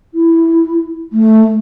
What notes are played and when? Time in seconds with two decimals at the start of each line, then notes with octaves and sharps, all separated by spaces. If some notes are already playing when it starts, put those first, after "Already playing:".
0.14 E4
1.13 A3